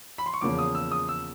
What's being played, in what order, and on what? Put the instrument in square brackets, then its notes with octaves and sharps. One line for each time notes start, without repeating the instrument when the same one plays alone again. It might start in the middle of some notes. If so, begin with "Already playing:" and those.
[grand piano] B5
C6
C#6
E2 C#3 F3 A#3 D6
D#6
E6
D#6
E6